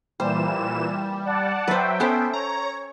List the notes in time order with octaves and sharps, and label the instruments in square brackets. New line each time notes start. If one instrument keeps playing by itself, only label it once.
[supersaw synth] A#2 E3 E7 [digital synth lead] G3 [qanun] C5
[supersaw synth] D5 F#5 A5
[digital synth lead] F#3 [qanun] B4 C5 [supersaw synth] E5 G5
[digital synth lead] B3 [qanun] C#4 A4 C5
[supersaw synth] C#5 [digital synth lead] A#5